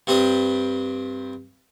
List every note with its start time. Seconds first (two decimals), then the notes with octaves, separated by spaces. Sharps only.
0.07 G2 G3 C4 D4 D#6